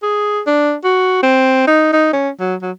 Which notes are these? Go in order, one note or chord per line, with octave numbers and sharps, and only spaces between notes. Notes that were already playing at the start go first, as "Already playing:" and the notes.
G#4
D4
F#4
C4
D#4
D#4
C#4
F#3
F#3